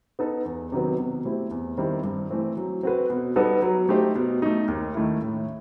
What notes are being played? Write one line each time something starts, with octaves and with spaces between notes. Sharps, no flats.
B3 D#4 A4
E2
C3 D#3 F#3 B3
B2
A3 C4 E4 G4
E2
D#3 G3 C4 E4
G2
E3 A3 C4
F#3
C4 F#4 B4
B2
G3 B3 D#4 A4
F#3
A3 D#4 G4 C5
B2
A3 D#4
D#2
D#3 A3 E4
A2